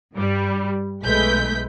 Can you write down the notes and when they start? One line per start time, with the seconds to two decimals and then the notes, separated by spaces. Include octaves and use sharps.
0.14 G2 G3
1.03 B1 G#3 A3 B4 G6 B6